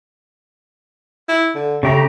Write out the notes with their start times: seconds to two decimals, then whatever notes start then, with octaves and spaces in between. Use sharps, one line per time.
1.29 E4
1.55 D3
1.83 C#3 A3 G4 A#5